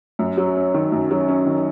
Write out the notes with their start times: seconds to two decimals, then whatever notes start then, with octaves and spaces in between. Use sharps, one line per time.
0.19 F#2
0.37 F#3
0.56 C#4
0.74 D#3
0.92 F#2
1.11 F#3
1.28 C#4
1.46 D#3